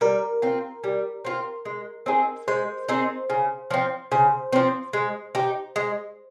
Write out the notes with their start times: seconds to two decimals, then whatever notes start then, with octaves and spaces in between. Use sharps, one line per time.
0.01 G3 A#4
0.42 C4 F4
0.84 G3
1.25 C4 F4
1.65 G#3
2.06 C4 D#4 G#4
2.48 G#3 C5
2.88 C4 D#4 G#4
3.30 C#3
3.71 F3 C4
4.12 C#3 C5
4.52 F3 C4
4.93 G#3
5.35 D#4 G4
5.76 G#3